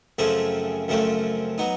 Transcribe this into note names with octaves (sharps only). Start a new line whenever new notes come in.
F#2 C#3 F3 A3 C4 G#4
F#2 C#3 F3 A3 C4
F#3 B3 D#4